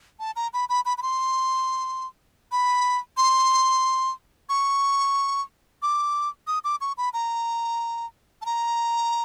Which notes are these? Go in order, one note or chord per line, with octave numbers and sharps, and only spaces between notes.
A5
A#5
B5
B5
B5
B5
C6
B5
C6
C#6
D6
D#6
D6
C#6
B5
A#5
A5
A#5